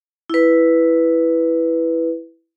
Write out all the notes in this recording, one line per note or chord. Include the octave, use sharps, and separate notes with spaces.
E4 B4